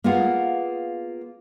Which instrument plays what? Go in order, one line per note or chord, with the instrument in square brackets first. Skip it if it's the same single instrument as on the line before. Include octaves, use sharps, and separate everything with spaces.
[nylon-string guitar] A#3 B3 F4 G#4 F#5